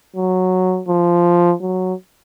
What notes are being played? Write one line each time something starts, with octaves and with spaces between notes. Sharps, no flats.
F#3
F3
F#3